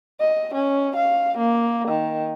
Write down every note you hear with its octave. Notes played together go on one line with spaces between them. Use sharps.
D#5
C#4
F5
A#3
D#3